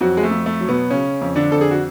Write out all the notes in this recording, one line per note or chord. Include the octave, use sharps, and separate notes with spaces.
F2 F#3 F#4
G#3
A3
F2
A3
F#3
B2 B3
C#3 C#4
F2
D3 D4
F2 A4
G#4
F#4